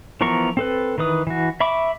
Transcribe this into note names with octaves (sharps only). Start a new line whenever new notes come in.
E3 F3 B3 A#4 C#6
C4 A4 B4
D#3 E3 B4 D#6
E3 F#4
E5 B5 C#6 D6